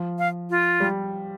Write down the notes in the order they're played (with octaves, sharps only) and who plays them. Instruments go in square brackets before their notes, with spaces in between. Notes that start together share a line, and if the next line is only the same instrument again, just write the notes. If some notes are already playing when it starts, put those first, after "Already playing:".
Already playing: [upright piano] F3
[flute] F5
F4
[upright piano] G3